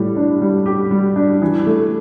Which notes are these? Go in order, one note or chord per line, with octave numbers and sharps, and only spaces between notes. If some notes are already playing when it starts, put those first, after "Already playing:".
Already playing: A2 G3 G4
D4
G3
G4
G3
D4
E3
A3